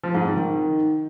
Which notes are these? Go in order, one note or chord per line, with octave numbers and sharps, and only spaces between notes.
F3
G#2
C4
D#3